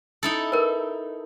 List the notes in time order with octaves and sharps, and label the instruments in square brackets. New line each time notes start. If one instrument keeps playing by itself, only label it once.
[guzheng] D#4 E4 A4
[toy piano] A#4 B4